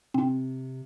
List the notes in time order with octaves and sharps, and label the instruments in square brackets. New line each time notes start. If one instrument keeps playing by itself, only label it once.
[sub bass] C3 [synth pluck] C4